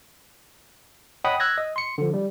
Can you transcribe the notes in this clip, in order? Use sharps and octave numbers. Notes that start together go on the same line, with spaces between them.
C#5 D#5 F#5 G5 B5 D#6
E6 F#6 G#6 A#6
D#5
C6 C#7
D3 F3
G3